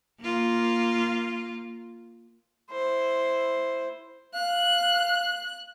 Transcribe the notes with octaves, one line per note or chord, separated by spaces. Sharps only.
A#3 F4
E4 C5
F5 F#6